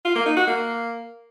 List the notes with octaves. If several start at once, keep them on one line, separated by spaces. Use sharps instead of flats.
F4
A#3
D#4
F#4
A#3